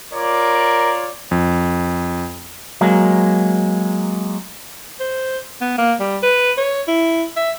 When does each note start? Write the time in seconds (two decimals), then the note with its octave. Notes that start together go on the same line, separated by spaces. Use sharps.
0.13 F4 A#4 C#5 D5
1.31 F2
2.81 F#3 G#3 A#3
5.00 C5
5.61 B3
5.78 A#3
6.00 G3
6.23 B4
6.58 C#5
6.88 E4
7.36 E5